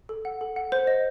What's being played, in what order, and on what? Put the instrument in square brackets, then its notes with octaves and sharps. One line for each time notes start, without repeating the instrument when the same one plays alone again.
[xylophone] A4
F#5
A4
F#5
C5
D#5